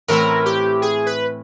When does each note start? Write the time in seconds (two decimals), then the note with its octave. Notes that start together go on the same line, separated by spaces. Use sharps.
0.08 A2 E3 A3 C4 E4 A#4
0.45 G4
0.82 G#4
1.06 B4